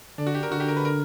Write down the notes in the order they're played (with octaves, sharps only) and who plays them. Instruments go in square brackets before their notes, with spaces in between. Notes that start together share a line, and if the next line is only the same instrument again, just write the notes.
[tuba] D3 [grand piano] D4
[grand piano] F#4
G4
A#4
[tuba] D3 [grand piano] F#4
[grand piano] G4
A#4
B4
A#4